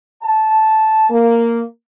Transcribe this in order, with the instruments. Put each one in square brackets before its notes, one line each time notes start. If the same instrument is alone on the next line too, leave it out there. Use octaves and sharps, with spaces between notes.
[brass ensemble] A5
A#3